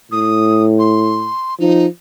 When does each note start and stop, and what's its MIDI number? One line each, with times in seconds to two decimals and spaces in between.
0.12 1.31 45
0.12 0.63 87
0.79 1.55 84
1.60 1.87 53
1.60 1.86 63